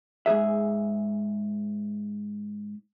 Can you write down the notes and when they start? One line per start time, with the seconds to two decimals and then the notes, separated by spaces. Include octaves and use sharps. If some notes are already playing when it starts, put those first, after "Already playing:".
0.26 G#2 C3 G#4 E5